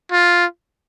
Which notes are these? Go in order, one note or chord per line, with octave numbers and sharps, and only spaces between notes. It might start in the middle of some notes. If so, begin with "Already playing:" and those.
F4